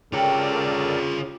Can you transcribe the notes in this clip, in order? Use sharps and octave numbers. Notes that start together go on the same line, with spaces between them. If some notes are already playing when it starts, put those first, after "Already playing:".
C#3 F4 G4 A4 A#4 C#5 D5